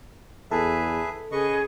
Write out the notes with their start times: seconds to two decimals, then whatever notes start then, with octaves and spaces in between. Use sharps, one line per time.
0.51 E2 G#4 A4 B4 E5
1.32 C#3 G#4 B4 D#5 C#6